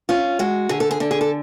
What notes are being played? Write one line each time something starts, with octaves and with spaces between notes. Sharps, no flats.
C#4 F4
G#3 F#4
D3 G#4
A4
G#4
D3 A4
G#4
A4